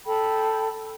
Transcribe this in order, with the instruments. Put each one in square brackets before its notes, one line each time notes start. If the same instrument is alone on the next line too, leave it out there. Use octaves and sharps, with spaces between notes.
[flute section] A4 G5 B5